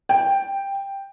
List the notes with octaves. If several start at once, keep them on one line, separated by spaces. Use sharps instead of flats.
G5